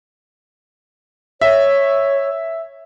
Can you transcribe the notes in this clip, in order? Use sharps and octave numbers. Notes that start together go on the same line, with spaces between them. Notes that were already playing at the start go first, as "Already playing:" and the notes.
C#5 E5